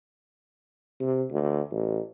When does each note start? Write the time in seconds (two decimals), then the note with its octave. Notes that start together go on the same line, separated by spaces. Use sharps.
1.00 C3
1.31 D2
1.71 A1